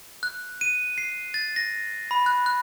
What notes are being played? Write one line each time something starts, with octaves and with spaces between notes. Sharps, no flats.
F#6
D#7
C7
A6
A#6
B5
F#6
F#6